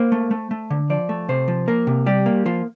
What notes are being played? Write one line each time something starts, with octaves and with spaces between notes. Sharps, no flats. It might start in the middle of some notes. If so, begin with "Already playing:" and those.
Already playing: A#3 C5
A3
A3
A3
D3
F3 D5
A3
C3 C5
F3
A#3 A#4
C3
G3 G4
A#3
F3 F4